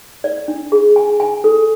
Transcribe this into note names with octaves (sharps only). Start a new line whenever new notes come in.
D5
D4
G#4
G#5
G#5
A4